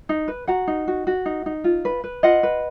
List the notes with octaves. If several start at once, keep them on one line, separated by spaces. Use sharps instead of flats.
D#4
B4
F#4 F#5 A#5
D#4
F#4
F#4
D#4
D#4
F4
B4
B4
F4 D#5 F#5
B4